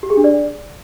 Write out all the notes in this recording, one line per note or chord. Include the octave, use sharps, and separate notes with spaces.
G4
G#4
D4
D5